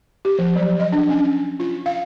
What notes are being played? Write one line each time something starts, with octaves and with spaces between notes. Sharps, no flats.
G4
F3
F#3
D#5
D4
C#4
F4
F5